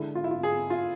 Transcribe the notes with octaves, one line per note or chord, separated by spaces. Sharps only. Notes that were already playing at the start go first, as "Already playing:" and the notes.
Already playing: D3 G#3 E4
F4
E4
F4
G#4
F4